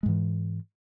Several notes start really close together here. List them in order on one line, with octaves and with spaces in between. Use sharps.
G#3 G#2 E3